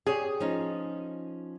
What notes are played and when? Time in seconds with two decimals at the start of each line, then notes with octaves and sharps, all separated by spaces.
0.07 G4 G#4 C#5 D5
0.40 F3 C#4 D#4